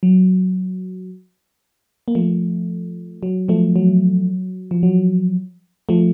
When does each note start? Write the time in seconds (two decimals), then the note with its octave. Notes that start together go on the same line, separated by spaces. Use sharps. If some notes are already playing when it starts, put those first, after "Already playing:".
0.03 F#3
2.08 A#3
2.15 F3 A3
3.23 F#3
3.48 F3 A3
3.76 F#3
4.71 F3
4.83 F#3
5.89 F3 A3